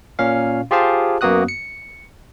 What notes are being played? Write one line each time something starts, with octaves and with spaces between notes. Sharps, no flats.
A#2 C#4 F5
F4 G4 G#4 C5 F5 A5
F#2 A#3 B3 F#4 D#6 F#6
C#7